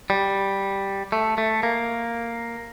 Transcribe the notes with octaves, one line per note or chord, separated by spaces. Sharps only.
G3
A3
A3
A#3